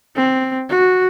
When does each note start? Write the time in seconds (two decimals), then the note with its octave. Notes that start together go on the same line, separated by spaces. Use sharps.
0.16 C4
0.69 F#4